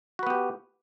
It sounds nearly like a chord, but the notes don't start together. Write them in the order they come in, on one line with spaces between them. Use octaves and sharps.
F#4 B4 B3 G4